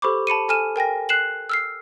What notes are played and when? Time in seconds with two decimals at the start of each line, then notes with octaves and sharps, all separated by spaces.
0.02 G4 A4 C5 B5 C#6 D6
0.27 A5 B5 C#7 D#7
0.49 A4 G#5 F6 D#7 E7
0.76 A#4 G5 G#5 A#6
1.09 F#6 C7 E7 F#7
1.49 E6 F6 C7